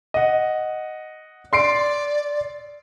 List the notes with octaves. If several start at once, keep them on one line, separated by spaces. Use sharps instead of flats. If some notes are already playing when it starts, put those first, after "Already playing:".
D#5 F#5
D5 C6 C7 D7